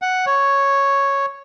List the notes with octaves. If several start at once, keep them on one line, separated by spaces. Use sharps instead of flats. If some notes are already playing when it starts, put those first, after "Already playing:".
F#5
C#5